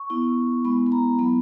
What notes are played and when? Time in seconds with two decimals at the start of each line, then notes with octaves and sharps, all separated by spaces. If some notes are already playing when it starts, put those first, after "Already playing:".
Already playing: C#6
0.10 B3 E4
0.65 G#3 B3 E4 B5
0.86 B5
0.92 A#5
1.19 F#3 B3 E4 B5